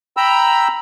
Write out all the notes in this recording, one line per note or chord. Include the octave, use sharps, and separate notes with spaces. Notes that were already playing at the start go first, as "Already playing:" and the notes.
G5 A#5 B5 E6